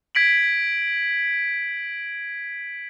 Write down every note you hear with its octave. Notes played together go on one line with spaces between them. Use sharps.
G#6 B6 D7 F#7